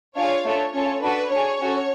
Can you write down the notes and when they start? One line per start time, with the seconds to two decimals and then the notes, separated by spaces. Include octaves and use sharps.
0.16 D4 F4 G#4 C#5 F5
0.44 A3 D4 F4 A4 C#5
0.73 C#4 F4 A4 C#5
1.02 D4 F#4 A4 B4
1.30 D4 G#4 C#5
1.59 C#4 F#4 A4